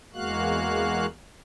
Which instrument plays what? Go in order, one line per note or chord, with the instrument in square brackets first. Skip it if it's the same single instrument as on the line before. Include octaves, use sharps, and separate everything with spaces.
[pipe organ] E2 G#3 A#3 F#4 F5 F#6